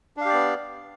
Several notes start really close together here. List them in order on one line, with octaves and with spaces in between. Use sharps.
D4 F5 G4 D5 B3